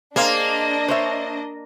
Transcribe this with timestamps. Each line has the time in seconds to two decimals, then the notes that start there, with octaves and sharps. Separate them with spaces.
0.16 A#3 D4 G#4 C5 D#5 F5
0.88 C5 C#5 E5